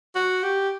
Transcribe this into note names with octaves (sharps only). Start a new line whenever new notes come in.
F#4
G4